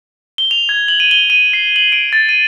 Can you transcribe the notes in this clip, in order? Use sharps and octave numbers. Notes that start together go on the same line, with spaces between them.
G7
F7
G#6
F#7
D#7
G7
D#7
C7
F#7
D7
A6
D#7